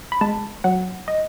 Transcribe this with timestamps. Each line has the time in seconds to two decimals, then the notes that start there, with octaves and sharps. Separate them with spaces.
0.12 B5
0.21 G#3 A5
0.64 F#3 F#5
1.08 D#5